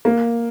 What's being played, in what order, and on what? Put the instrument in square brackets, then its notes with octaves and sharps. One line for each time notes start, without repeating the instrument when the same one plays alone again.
[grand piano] A#3